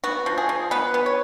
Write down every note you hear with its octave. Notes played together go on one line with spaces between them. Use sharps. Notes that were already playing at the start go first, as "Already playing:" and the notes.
B3 F#4
F3
G#4
F3
B3 B4
B3
C#5